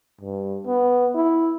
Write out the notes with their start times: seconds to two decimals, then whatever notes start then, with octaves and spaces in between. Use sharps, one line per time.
0.21 G2
0.66 B3
1.15 E4